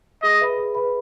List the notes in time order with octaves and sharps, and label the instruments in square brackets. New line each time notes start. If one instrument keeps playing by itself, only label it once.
[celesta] G#4 [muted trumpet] D#5
[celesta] B4 E5 B5
G#4
B4 E5 B5